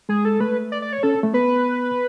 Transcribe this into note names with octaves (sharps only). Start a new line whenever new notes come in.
G#3 G#4
A4
A3 B4
D5
D5
C#5
C#4 A4
A3
B3 B4